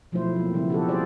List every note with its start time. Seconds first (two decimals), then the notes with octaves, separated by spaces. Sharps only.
0.12 B2 F3 F#3 A3 E4 C5
0.36 A#3 C4
0.53 C#3 F3 G3 B3 E4
0.70 F#4 G4 A4
0.89 G3 G#4 C5 D5